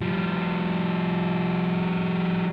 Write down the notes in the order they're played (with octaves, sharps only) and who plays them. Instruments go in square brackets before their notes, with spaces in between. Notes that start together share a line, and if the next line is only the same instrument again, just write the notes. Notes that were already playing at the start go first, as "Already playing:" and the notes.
[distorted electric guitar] F3 G3